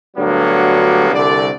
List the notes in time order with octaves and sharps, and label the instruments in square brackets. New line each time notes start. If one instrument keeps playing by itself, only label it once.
[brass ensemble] D2 G2 F#3 G3 A#3 B3
C2 D3 D5